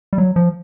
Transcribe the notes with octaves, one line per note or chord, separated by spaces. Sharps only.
G3
F#3
F3